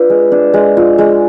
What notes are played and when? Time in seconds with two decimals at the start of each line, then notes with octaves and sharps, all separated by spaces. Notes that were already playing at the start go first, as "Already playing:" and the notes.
Already playing: D4 F4 B4
0.10 G#3
0.32 D4
0.54 G#3
0.77 F4
0.98 G#3